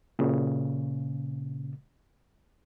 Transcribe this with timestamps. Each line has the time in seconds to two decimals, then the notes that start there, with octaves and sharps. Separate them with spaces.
0.19 A#2 C#3